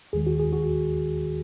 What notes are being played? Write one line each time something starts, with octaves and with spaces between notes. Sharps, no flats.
D#2 D#3 G#3 G#4
F#4
G#4
F#4